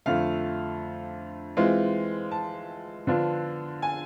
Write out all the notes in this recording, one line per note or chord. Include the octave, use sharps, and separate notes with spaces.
F2 D3 A3 F5
E3 G#3 C4 F4
A5
D3 F3 B3 D4 F4
G#5